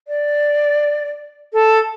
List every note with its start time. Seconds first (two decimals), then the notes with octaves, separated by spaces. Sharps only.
0.07 D5
1.52 A4